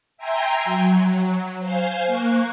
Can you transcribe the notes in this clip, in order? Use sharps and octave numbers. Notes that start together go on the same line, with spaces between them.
E5 G5 G#5 A#5 C6
F#3
C5 F5 G#5
A#3 C#6 F#6